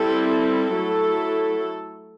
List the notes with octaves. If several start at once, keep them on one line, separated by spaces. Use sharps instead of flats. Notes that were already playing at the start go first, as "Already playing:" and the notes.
Already playing: G3 C4 E4 A4
A4
F#3 A3 E4